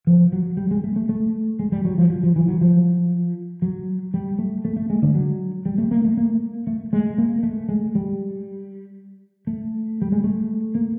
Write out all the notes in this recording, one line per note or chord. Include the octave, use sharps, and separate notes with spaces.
F3
F#3
G3
G#3
A3
A3
A3
G#3
G3
F#3
F3
F#3
F3
E3
F#3
F3
F#3
G3
A3
A3
A3
G#3
D3
F#3
G3
A3
A#3
A3
A#3
A3
G#3
A#3
A3
G#3
G3
A3
G3
G#3
A3
A#3